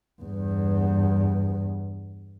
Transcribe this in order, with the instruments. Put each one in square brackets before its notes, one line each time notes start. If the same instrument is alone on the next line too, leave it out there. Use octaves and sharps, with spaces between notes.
[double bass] E2 G2